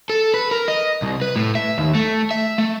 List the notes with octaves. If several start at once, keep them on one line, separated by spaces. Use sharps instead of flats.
A4
B4
A#4
D#5
C2
B4
A2
E5
D#2
A3
E5
A3